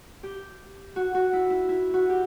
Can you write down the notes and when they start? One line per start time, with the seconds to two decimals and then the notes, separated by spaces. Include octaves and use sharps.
0.23 G4
0.96 F#4
1.15 F#4
1.33 E4
1.50 E4
1.69 E4
1.94 F#4
2.10 G4